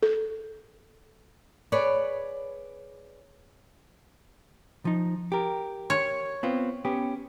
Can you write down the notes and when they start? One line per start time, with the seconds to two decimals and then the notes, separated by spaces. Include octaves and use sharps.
0.03 A4
1.72 G#4 B4 C#5 D5
4.85 F3 D#4
5.32 G4 A#4
5.90 C#5
6.43 B3 C4 F4
6.85 B3 C#4 G4